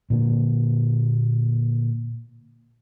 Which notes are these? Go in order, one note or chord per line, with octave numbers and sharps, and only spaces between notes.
A#2 D3 A#3